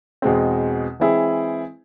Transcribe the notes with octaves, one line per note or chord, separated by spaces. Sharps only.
E2 B2 G#3 C4
E3 G#3 C4 E4 G#4